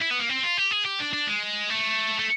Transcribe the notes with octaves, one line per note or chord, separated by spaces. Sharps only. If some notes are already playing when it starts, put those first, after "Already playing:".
E4
B3
A#3
C4
F4
G4
G#4
G4
D4
D4
G#3
A3
A3